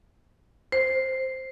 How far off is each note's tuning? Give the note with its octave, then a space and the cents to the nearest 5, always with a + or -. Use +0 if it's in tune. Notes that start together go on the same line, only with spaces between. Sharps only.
C5 +0